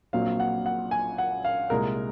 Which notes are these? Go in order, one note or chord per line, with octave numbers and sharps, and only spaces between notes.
A#1 A#2 F#3 C4 F5
F#5
F#5
G#5
F#5
F5
C2 A#2 G#3 A#4